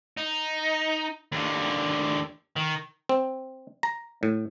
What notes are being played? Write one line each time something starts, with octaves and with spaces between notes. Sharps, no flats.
D#4
D#2 D3
D#3
C4
A#5
A2